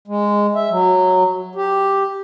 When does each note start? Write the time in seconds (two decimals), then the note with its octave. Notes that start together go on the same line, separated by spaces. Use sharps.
0.08 G#3
0.55 E5
0.70 F#3
1.55 G4